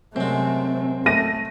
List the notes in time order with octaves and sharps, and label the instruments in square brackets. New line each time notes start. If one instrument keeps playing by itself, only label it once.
[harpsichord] F#2 G#3 [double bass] C3 A3 [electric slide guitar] C4
[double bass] A3 [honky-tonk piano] A#6 D#7